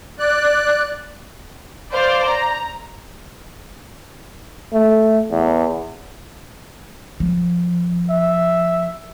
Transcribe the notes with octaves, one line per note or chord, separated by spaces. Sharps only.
D5 F#6
C5 D5 F5
A#5
A3
E2
F3
E5